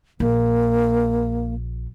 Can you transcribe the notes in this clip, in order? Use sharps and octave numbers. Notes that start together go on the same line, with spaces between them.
A#1 A#3